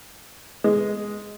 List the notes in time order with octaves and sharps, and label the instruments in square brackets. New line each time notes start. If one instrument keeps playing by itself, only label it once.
[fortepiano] G#3